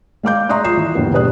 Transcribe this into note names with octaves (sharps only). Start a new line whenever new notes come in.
G#3 F5 D6 G6
E5 A#5 C6 C#6 D#6 F#6
F3 D#6 C7 E7
E3
G1 D#2 B3
E1 G2 B4 D5 D#6 F#6